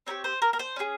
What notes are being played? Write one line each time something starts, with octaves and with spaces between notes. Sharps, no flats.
C4 D#4 G4 C#5
C5
A#4
A#4
C5
C#4 F4 G#4